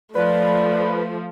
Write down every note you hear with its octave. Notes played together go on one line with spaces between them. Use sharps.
F3 A3 B4 D5